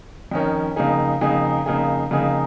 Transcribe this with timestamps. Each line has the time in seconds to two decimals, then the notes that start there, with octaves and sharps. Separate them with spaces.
0.31 F2 D#3 C#4 A#4
0.76 F2 C#3 A#3 D#4 G#4
1.21 F2 C#3 A#3 D#4 G#4
1.66 F2 C#3 A#3 D#4 G#4
2.11 F2 C#3 A#3 D#4 G#4